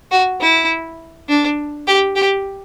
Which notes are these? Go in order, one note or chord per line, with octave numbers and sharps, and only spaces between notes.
F#4
E4
D4
G4
G4